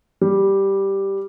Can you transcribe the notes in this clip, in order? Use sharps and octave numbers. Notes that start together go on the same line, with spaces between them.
G3